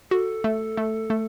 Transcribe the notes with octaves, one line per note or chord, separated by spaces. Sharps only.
F#4 A4
A3
A3
A3